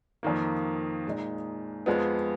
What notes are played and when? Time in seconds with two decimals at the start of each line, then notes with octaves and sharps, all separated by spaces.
0.23 F2 D#3 A#3
1.06 A#2 G#3 D#4
1.86 F2 F3 G#3 B3